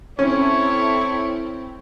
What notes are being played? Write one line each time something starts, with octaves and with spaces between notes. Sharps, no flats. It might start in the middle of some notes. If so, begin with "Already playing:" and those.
C4 C#4 E4 A4 C#5